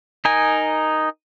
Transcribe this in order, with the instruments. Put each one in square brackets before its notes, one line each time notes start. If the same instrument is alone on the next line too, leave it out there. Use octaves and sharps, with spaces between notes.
[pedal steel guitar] D#4 A#4 G#5